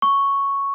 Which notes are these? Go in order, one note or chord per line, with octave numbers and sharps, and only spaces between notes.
C#6